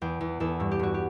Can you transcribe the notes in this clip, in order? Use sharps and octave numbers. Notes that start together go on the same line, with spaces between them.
E2 G5
E2
E2 A4
G2 A4
G4
G2 F#4
G4